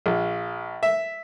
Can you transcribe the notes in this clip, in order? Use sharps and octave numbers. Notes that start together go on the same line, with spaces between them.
A#1
E5